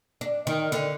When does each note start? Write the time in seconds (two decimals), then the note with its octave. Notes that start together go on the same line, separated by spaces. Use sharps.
0.21 D4
0.47 D#3
0.72 D3